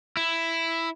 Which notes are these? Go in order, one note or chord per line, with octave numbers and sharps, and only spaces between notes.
E4